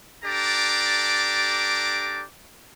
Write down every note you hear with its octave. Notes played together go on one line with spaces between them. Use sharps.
D4 G4 A4 D5 A#5 D6